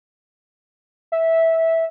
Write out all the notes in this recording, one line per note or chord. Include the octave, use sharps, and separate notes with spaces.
E5